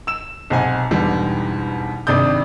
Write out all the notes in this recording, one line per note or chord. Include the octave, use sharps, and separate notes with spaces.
E6 E7
B1 C3 C5 F#5 G#5
E2 G#2 B2 D3 G3
G#1 C3 D4 D5 D#6 G6